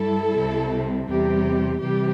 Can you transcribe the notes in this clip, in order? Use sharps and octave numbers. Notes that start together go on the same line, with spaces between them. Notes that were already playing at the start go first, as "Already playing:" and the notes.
Already playing: G2 G3 E4 A4
C2 C3 G3
E2 C3 G3 G4
C3 E3 G3 G4